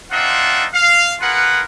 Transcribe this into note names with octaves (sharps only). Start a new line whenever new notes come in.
C4 D4 D#4 F4 E5 F#5
F5
F4 G#4 A#4 B4 F#5